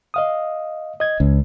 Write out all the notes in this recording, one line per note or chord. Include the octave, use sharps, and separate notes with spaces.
D#5 F5 D#6
D#5 G#6
C#2 C#4